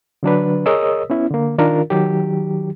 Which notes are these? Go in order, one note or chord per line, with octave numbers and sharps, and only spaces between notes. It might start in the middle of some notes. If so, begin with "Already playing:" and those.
D3 F#3 D4 B4
G#4 A#4 C#5 D#5 D#6 E6
B3 C#4 E4
D3 A#3
D#3 D4 F4 A#4
D#3 F#3 G4